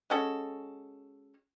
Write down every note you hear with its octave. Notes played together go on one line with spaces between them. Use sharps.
G#3 C#4 F#4 A4